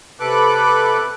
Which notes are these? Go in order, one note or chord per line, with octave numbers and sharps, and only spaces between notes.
C3 A4 B4 D6 F#6